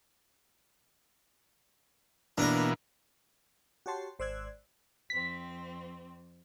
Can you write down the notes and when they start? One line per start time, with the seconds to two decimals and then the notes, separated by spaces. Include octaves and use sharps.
2.38 B2 E3 A#3 D4 A#4
3.86 F#4 G4 C#5 A5 C6
4.19 G#1 C5 D5 E6 F#6 G#6
5.10 F2 C4 B6